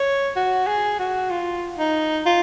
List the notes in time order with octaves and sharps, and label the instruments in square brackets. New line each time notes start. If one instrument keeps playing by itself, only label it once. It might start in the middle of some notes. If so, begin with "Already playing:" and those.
Already playing: [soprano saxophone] C#5
F#4
G#4
F#4
F4
D#4
F4